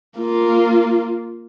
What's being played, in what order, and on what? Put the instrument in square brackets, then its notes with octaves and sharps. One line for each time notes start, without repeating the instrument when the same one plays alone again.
[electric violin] A#3 F4